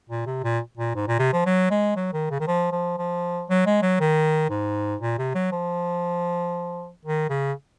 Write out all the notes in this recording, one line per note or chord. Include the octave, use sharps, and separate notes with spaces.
A#2
C3
A#2
A#2
G#2
A#2
C3
F3
F#3
G#3
F#3
D#3
C#3
D#3
F3
F3
F3
F#3
G#3
F#3
D#3
G#2
A#2
C3
F#3
F3
D#3
C#3